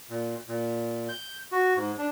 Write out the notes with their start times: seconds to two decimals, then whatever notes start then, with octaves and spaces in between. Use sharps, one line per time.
0.10 A#2
0.48 A#2
1.09 G6
1.52 F#4
1.77 G#2
1.98 D4